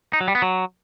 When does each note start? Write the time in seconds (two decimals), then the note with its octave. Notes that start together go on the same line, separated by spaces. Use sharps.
0.13 D#4
0.21 F#3
0.28 G3
0.35 B3
0.42 F#3